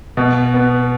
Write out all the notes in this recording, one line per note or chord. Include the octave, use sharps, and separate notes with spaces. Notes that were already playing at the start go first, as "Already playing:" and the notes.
B2
B3